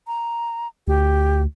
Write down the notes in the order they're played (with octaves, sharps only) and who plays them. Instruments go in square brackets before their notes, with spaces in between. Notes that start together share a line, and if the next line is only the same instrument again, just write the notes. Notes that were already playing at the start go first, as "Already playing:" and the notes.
[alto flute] A#5
[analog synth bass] D2 [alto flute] G4